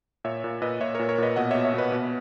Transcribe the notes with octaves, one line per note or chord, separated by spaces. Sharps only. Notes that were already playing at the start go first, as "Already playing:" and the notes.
A#2 C#5 E5
A#2
A#2 B4 D#5
A#2 C#5 E5
A#2 A#4 C#5
A#4 C#5
A#2 B4 D#5
B2 D#5 F#5
B2 C#5 E5
C#5 E5
B2 B4 D#5
B2